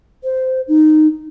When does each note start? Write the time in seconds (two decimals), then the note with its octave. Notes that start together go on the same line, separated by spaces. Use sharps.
0.24 C5
0.68 D#4